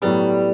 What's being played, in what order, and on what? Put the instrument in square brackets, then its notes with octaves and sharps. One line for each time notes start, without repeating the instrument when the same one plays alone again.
[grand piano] A2 F#3 B3 [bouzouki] G3